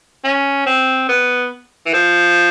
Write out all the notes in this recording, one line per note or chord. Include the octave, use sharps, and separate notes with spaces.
C#4
C4
B3
E3
F3